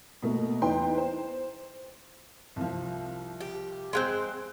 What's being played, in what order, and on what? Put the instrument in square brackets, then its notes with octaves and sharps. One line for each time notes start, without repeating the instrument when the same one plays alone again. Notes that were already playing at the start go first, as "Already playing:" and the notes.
[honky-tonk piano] B2 A3 A#3
E2 D#4 B4 G5 C6
C5
[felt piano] C2 F3
[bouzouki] G4
[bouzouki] G#3 A#3 C4 [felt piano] C6 F#6 G6